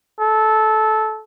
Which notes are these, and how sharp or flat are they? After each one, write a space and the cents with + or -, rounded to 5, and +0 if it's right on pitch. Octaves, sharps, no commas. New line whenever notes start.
A4 -15